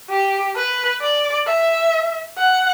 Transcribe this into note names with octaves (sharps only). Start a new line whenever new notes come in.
G4
B4
D5
E5
F#5